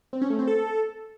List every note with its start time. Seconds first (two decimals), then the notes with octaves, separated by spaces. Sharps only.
0.13 C4
0.22 C#4
0.30 A3
0.39 C4
0.47 A4